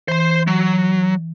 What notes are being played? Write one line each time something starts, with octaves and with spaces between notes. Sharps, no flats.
E3 C5 C6
F#3